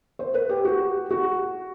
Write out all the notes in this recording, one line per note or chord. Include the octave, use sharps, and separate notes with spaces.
C5
B4
G4
F#4
F#4